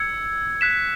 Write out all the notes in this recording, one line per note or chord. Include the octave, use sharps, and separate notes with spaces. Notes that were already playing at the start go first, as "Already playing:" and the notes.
Already playing: E6 G#6 C#7
F#6 B6 E7